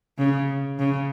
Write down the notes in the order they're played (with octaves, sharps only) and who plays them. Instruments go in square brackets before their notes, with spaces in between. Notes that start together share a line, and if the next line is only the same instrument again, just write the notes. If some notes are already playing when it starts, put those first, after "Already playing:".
[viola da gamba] C#3
C#3